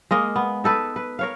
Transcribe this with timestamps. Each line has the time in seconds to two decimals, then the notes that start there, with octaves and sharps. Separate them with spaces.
0.11 G#3 A#3 D#5
0.36 B3
0.64 D#4 A4 B4
0.96 B4
1.19 A#4 C#5 F5